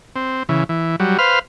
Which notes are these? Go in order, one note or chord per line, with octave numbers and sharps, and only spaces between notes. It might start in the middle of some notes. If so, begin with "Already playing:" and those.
C4
C#3 E3
E3
F#3 G3
B4 C5 F5 F6